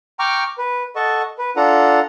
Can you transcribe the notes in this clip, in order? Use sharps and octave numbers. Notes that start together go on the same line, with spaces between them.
G5 A#5 C#6 D6 F6
B4
A4 D#5 F#5 A5 C#6
B4
D4 F4 A4 F#5 A#5